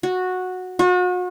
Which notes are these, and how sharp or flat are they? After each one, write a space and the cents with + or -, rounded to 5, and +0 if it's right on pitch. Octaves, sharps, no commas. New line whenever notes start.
F#4 -10
F#4 -40